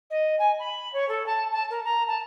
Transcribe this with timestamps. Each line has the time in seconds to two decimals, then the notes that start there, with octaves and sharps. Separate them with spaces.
0.10 D#5
0.39 G#5
0.59 B5
0.93 C#5
1.08 A4
1.26 A5
1.51 A5
1.70 A#4
1.84 A#5
2.07 A5